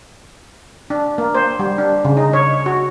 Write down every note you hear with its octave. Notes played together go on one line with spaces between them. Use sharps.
D4
A#3
C5
G3
D4
C#3
D#4
C#5
F#4